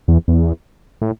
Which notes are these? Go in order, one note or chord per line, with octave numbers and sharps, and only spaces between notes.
E2
E2
A2